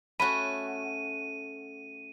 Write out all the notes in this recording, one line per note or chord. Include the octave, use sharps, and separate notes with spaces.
A3 C#4 F#4 B5 D#7